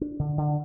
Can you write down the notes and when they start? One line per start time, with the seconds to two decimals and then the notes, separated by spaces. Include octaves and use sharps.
0.01 D4
0.19 D3
0.38 D3